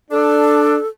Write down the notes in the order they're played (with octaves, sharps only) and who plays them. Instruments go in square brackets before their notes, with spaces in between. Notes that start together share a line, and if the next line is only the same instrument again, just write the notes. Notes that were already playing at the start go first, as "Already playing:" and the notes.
[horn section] D4 [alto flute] A4